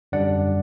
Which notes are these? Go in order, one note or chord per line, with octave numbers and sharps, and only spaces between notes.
F#2 D3 G3 D4 D5 F#5